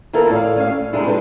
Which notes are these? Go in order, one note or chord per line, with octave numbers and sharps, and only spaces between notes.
D#3 B3 E4 F4 A4 A#4
A2 D5 F5
A3 C#4 C#5 F5
A2
C3 D#3 G3 G#3 D4 E4
F3 G#3 C4 A4 B4 C5